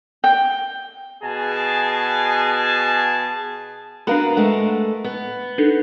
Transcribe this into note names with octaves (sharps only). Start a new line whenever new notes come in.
G5
B2 G#4 G#5 A5
B3 D4 F#4 A#4 F5 B5
G#3 A3 F#5
B3
D4 D#4 A4